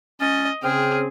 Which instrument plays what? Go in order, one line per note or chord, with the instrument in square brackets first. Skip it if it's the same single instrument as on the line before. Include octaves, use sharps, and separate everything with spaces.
[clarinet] C#4 [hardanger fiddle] D#5 [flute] A6
[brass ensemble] C#3 C4 [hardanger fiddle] G#4 [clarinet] G5 [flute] F6